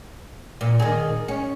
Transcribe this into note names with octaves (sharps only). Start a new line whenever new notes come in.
A#2
D#3 G#4
C#4